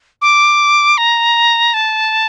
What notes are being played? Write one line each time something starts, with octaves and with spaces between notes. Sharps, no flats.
D6
A#5
A5